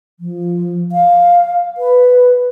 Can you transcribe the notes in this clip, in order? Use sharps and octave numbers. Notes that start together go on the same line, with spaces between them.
F3
F5
B4